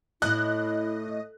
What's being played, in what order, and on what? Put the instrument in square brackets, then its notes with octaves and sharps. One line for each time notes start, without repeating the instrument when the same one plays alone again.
[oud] A2 [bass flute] E4 [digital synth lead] D#5 [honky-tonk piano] F#6